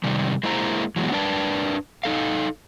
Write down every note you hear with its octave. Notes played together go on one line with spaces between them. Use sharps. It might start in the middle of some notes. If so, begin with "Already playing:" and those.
C3 D#3 G3
G#3 A#3 E4 C5 A#5
E3 F#3 G#3 B3
D4 A#4 B4 D5 A5
D#4 A4 F5